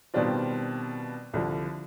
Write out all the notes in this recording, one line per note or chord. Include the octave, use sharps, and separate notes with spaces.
B2 D#3 G3 C4 D4 F4
C2 D3 F3